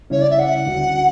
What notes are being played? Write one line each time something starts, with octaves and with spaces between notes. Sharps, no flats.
C#3 G3 C#4 E4 C#5
D5
E5
F#5
D2 D3 G3 C#4 F#4